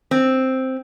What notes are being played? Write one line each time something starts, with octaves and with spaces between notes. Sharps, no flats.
C4